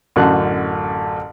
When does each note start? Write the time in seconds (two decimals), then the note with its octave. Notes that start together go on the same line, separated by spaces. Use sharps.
0.16 A1 F#2 D3 F#4 F#6